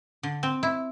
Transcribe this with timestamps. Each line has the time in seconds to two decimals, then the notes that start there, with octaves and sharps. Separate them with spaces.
0.23 D3
0.43 C4
0.63 E4